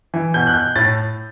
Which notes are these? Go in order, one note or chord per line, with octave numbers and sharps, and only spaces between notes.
E3
B2 G6
F#6
G6
A2 A6